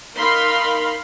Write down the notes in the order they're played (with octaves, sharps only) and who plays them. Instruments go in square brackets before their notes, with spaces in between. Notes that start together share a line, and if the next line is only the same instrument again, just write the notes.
[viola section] D#4 A#4 F5 B5 C6